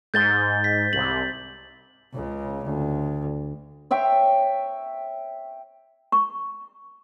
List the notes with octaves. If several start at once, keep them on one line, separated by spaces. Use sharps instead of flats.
G#2 G6 A6 G7
B6
C2 C3 F#7
C#2 C#3
D2
C#5 E5 G5 C6
C#6